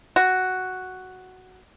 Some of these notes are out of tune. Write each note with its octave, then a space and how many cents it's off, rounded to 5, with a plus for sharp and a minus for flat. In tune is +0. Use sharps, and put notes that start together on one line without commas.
F#4 +5